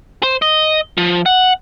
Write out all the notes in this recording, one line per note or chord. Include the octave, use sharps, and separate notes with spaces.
C5
D#5
F3
F#5